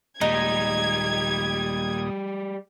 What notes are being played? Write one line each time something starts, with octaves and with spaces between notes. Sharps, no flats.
D#2 A#2 G3 G#3 D#4 D#6 G#6